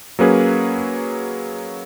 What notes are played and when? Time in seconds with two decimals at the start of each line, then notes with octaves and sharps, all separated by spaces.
0.19 F#3 A#3 C#4 G#4 B4